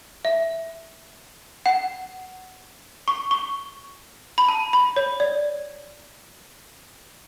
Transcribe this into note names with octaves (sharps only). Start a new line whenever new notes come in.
E5
F#5
C#6
C#6
B5
A5
B5
C#5
D5